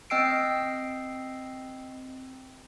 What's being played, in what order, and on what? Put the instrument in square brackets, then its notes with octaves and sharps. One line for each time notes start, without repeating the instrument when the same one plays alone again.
[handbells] C4 D#5 G5 E6 C7 D7